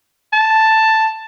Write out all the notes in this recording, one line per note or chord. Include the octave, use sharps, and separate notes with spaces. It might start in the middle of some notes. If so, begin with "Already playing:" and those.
A5